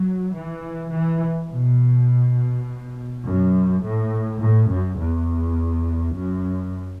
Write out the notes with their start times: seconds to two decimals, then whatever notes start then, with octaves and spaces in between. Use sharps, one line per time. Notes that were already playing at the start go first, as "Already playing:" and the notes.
Already playing: F#3
0.34 E3
0.93 E3
1.50 B2
3.25 F#2
3.83 A2
4.41 A2
4.70 F#2
4.99 E2
6.16 F#2